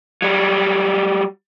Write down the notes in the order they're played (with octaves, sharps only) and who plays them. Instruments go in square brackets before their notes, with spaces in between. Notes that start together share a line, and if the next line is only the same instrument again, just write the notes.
[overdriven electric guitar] F#3 G3